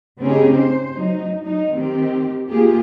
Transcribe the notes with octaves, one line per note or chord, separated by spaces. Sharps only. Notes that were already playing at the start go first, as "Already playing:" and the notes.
C#3 C4 C#4 D#4 G4 G#4
C5
F#3 D#4
F#3 D#4
D#3 C4 G4
A#3 F4 G4 G#4